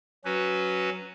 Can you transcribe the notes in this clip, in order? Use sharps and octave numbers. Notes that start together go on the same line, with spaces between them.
F#3 C#4 F#4 B4